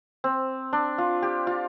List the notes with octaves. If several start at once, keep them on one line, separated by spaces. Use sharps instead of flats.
C4
D4
F4
G4
F4